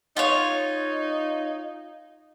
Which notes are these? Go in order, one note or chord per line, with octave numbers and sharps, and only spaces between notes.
D#4 F4 C#5